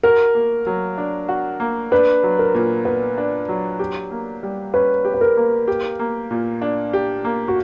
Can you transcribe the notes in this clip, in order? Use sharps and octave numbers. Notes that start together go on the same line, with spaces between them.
F#4 A#4
A#3
F#3
D4
F#4
A#3
D4 B4
F#3
A#4
A#2
B3 B4
D4
F#3
G4
A#3
G3
C#4 B4
G4
B4
A#4
A#3
G4
A#3
A#2
D4
G4
A#3
F#4